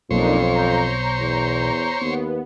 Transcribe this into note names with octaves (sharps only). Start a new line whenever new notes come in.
B1 F2 A#3 D4 D#4 C5 C#5
A#5 G6
E2
D#2 B3